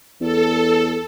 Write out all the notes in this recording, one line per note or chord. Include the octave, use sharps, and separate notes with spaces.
E2 A4